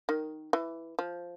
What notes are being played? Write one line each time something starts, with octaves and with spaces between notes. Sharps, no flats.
D#3
E3
F3